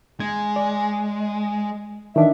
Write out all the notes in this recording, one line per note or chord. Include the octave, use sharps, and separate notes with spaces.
G#3 G#6
D5
D#3 E3 D4 E5